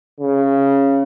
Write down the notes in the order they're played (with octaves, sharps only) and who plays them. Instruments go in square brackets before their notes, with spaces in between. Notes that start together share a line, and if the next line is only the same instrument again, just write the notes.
[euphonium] C#3